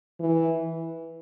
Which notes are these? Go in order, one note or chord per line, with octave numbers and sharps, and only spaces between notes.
E3